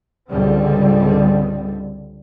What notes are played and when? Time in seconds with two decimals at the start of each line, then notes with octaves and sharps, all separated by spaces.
0.29 C#2 G#2 D3 G3 C4